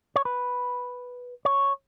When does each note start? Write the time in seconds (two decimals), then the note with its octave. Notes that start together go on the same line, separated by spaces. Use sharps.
0.16 C#5
0.25 B4
1.45 C#5